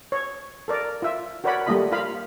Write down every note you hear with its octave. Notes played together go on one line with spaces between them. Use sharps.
C#5
A4 A#4 D5
F4 E5
F#4 A#4 C#5 D5 F#5 B5
G3 A3 A#3 F4 D#5 B5
F4 A#4 F5 B5